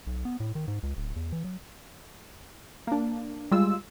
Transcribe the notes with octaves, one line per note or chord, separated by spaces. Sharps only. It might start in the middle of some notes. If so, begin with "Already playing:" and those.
B1
B3
A2
D#3
G#2
C#2
D1
E2
E3
F#3
A#3 D4
G3 G#3 F4 E6